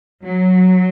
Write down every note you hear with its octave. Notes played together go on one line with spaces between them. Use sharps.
F#3